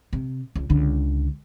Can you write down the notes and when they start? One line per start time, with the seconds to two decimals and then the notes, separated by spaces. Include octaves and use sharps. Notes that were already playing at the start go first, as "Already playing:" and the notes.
0.13 C3
0.56 C#2
0.70 C#2 D3